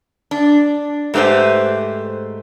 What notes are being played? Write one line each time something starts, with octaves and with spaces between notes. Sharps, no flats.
D4
G#2 A3 G4 B4 C5